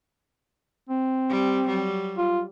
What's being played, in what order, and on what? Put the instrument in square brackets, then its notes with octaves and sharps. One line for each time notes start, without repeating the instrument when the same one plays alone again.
[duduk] C4
[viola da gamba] G3
F#3 G3
[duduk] F4